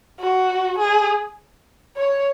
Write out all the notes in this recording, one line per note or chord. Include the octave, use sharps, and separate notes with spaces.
F#4
G#4
C#5